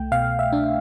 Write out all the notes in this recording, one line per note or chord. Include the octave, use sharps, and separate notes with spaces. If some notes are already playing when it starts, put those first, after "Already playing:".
Already playing: C2 A3 G5
B2 F5
E5
D4